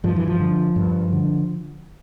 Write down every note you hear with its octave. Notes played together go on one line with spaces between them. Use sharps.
G2 F3
E3
F3
D3
G2
D3